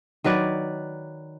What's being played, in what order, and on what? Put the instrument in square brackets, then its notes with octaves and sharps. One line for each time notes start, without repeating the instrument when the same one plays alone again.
[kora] D#3 F#3 B4 D5